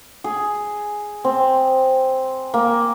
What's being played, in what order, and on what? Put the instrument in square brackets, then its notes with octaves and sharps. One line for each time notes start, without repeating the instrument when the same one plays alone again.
[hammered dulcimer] G#4
C4
A#3